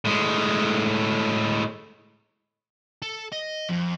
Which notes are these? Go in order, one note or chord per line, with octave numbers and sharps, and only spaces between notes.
A2 G#3
A4
D#5
F2